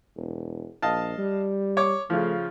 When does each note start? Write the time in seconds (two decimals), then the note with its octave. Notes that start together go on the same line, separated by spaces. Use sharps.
0.16 E1
0.82 A#1 D#5 F5 A5
1.18 G3
1.77 C#5 D6
2.10 C#3 F3 A3